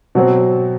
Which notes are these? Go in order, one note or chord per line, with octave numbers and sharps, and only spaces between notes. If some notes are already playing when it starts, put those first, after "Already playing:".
B2 F#3 C4